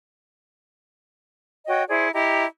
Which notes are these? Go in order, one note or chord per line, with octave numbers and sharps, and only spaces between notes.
F#4 C#5 D#5 G5
E4 G#4 C5 D5
E4 G4 D#5 A#5